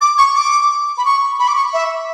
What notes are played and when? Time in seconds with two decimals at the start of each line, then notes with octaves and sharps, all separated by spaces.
0.01 D6
0.18 C#6
0.35 D6
0.98 B5
1.05 C#6
1.39 B5
1.48 D6
1.56 C#6
1.73 E5